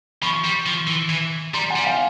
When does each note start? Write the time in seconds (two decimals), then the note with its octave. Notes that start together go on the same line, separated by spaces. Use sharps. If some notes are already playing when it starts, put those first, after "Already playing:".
0.22 F3 B5 C#6
0.44 G3
0.66 F3
0.87 E3
1.09 E3
1.54 G3 A#5 C6
1.70 F#5 G#5
1.76 G3
1.87 F5 G5